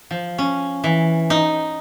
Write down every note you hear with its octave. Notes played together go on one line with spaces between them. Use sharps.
F3
C#4
E3
D#4